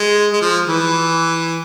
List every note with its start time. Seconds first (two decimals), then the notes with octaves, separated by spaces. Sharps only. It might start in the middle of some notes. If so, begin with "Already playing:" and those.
Already playing: G#3
0.33 G#3
0.41 F3
0.67 E3